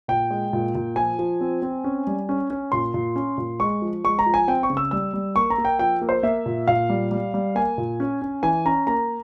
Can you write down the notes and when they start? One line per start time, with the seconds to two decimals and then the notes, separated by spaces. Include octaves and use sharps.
0.08 A#2 G5
0.31 G#3
0.53 A#2
0.75 A#2
0.96 F3 G#5
1.19 F3
1.41 C4
1.62 C4
1.84 C#4
2.07 G3
2.29 C#4
2.50 C#4
2.72 A#2 C6
2.94 A#2
3.16 C#4
3.38 A#2
3.60 G#3 C#6
3.82 F3
4.04 G#3 C#6
4.19 A#5
4.26 F3
4.34 G#5
4.48 C4 G5
4.63 C#6
4.70 C#3
4.77 E6
4.91 G3 E6
5.13 G3
5.36 A#3 C#6
5.50 A#5
5.58 A#3
5.65 G5
5.79 F3 G5
6.02 A#3
6.09 C5
6.23 A#3 E5
6.46 A#2
6.68 A#2 F5
6.90 G3
7.11 G3
7.34 G3
7.55 A#3 G#5
7.78 A#2
8.00 C#4
8.22 C#4
8.43 E3 G#5
8.65 C#4 A#5
8.87 A#3 A#5